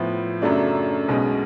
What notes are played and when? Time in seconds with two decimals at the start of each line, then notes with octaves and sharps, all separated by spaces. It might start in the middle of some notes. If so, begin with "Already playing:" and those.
Already playing: A2 F3 B3
0.42 F#2 C#3 F#3 A3 D4
1.08 B1 B2 G#3 C#4